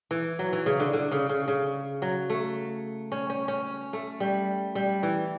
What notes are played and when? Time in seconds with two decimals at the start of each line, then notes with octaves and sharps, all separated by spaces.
0.11 E3
0.39 F#3
0.52 E3
0.66 C#3
0.80 D3
0.93 D3
1.12 C#3
1.29 C#3
1.48 C#3
2.02 F#3
2.30 A3
3.12 C#4
3.30 C#4
3.48 C#4
3.93 A3
4.20 G3
4.75 G3
5.03 E3